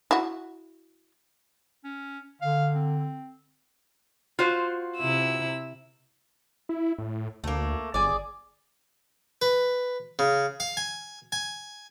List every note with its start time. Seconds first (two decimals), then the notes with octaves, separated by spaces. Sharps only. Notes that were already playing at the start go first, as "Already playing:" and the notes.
0.11 E4 F#4
1.84 C#4
2.42 D3 F5
2.75 C4
4.39 F4 F#4 C5
4.98 C3 E4 E6
6.69 E4
6.98 A2
7.44 D2 A3 A#3
7.94 G1 G#4 D5
9.42 B4
10.19 C#3
10.60 F5
10.77 G#5
11.32 G#5